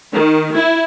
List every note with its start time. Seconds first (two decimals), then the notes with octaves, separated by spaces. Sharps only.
0.13 D#3
0.54 E4